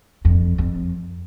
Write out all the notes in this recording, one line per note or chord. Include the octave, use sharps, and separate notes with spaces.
F2
F2